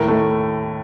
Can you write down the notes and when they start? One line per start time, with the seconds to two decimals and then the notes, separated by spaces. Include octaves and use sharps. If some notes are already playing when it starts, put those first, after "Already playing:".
Already playing: D#2 A2 A#4
0.08 A3